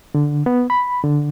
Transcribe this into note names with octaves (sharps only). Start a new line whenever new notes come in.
D3
B3
B5
D3